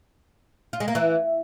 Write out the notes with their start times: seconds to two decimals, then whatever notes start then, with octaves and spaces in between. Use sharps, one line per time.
0.73 F4
0.80 G#3
0.88 A#3
0.95 E3